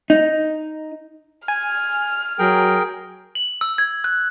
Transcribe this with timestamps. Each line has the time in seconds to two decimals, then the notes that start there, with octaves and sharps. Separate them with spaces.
0.10 D#4
1.48 G#5 F6
2.39 F#3 G#4 A#4 G5
3.35 F#7
3.61 E6
3.78 G#6
4.04 F#6